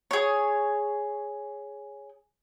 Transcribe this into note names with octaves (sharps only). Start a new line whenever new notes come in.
G#4 C#5